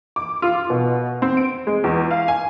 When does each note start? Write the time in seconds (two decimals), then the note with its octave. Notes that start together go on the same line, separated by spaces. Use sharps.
0.16 D6
0.42 F4
0.70 B2
1.22 C4
1.37 D7
1.67 G#3
1.84 E2
2.11 F5
2.28 G#5